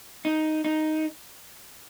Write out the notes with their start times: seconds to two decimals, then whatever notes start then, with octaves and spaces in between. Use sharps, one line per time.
0.25 D#4
0.64 D#4